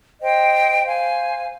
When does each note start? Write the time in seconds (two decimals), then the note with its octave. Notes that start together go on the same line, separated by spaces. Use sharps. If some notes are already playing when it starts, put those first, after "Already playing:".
0.21 C5 D#5 G5
0.83 C5 F5 G#5